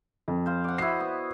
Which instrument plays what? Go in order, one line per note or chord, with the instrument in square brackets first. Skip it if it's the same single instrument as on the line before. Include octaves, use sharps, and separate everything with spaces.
[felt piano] F2
[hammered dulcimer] C5 F5
D5 F#5
[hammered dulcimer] E4 F#4 D#5 [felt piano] C7
[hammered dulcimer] B3